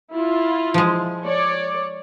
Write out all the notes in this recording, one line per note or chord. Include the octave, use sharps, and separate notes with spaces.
E4 F4
F3 G#3
C#5 D5